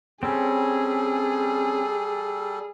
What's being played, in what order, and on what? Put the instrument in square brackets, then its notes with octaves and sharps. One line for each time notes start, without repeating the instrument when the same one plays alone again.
[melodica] G3 A4 [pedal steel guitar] C4 C#4 [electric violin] G#4